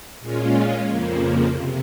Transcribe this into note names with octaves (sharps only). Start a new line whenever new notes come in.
A#2 G#3 C#4 F4
F2 C#3 F3 A#3
C3